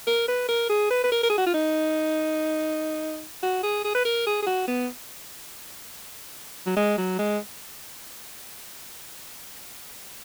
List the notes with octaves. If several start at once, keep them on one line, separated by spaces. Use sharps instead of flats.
A#4
B4
A#4
G#4
B4
B4
A#4
A#4
G#4
F#4
F4
D#4
F#4
G#4
G#4
B4
A#4
G#4
G#4
F#4
B3
F#3
G#3
F#3
G#3